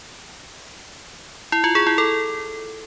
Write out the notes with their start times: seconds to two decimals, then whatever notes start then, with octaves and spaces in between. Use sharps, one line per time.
1.52 E4
1.64 F4
1.75 G#4
1.87 E4
1.98 A4